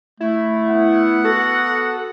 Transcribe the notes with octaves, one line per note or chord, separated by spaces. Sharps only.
A3 E4
B3 F#5
F#4 A4